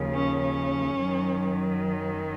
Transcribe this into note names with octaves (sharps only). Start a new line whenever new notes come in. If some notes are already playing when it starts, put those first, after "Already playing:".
Already playing: D#2 C#3 F3
C#4
C#4
F#2 D#3 F#3